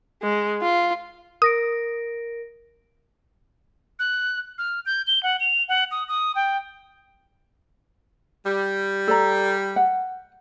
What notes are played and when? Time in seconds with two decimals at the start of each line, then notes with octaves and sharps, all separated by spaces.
0.23 G#3
0.62 F4
1.42 A#4 D#6 A#6 D7
3.99 F#6
4.58 F6
4.86 G6
5.07 G7
5.23 F#5
5.40 F7
5.69 F#5
5.91 D#6
6.08 D#6
6.35 G5
8.45 G3
9.08 A4 D5 A#5
9.76 F#5